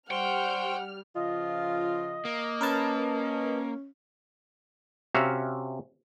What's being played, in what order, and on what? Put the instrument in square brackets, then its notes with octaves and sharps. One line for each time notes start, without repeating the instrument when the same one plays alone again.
[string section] G3 F6 [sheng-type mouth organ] C5 C#6 [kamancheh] F#5 [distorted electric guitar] G5
[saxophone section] C#3 F3 F4 [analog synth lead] D#5
[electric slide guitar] A#3
[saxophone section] C#4 [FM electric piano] A#4 B4 A5
[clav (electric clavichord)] C3 C#4 F#4 E5 F5